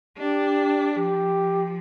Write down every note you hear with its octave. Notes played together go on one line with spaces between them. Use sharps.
D4 G4
F3 G4